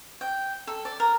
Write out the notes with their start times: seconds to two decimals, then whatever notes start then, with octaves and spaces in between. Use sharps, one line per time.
0.21 G5
0.67 A4
0.85 D5
1.00 A#4